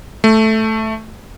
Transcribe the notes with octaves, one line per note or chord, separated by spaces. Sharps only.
A3